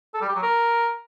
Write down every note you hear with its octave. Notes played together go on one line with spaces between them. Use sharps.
A4
G3
G4
F#3
A#4